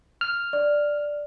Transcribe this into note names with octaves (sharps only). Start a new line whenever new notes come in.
F6
D5